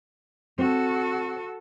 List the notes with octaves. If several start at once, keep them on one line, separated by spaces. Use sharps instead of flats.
C4 F#4 A4